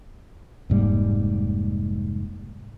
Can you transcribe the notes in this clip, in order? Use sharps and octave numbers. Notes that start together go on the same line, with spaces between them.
F1 G#2 G3 A#3